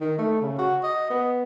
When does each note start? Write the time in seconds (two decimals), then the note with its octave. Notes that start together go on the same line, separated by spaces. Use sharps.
0.01 D#3
0.18 A3
0.42 C#3
0.59 F#4
0.83 D#5
1.10 B3